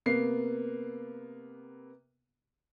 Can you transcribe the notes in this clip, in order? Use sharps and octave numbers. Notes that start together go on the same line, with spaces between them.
C3 A#3 B3 C7